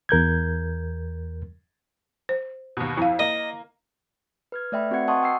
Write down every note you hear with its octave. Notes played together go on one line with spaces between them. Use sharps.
E2 A#4 G6 G#6
C5
D#2 B2
F2 E4 F5
A#3 D#5
B4 F6 G#6
A3 D5 E5 G5 B5
C4 F#4 B4 F#5 G#6 C#7
D#5 F#5 A5 C6 C#6 D#6
F#4 G5 E6 C7